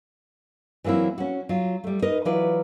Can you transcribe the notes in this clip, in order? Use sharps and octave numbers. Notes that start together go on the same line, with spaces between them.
E3 F#3 A#3 C4 E4
C#4 F#4
F#3 F4
G3 A3
D#4 A#4 B4 D#5
E3 F#3 E4 F4 B4 D5